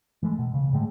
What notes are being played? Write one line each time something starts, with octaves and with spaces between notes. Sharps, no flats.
E3 G#3 A3
B2
C#3
A2 D3 G#3 A3